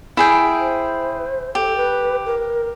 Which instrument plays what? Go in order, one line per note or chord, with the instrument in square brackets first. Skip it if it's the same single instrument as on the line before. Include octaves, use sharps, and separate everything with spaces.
[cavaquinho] E4 G#4 G5
[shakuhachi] C5
[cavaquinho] G4 [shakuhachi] A4
[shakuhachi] B4
A#4